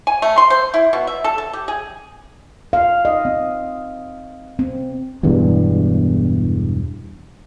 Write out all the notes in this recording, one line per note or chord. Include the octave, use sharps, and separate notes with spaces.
G#5
A3
C6
C5
E4
B2
E5
A4
A4
G4
G#4
F5
D#5
C4
C4
E1 E2 G2